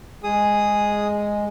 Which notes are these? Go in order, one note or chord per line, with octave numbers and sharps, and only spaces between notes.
G#3 G#4 D#6